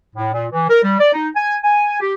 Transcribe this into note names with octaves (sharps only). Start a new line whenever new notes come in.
A2
A#2
E3
A#4
G3
D5
D#4
G#5
G#5
G4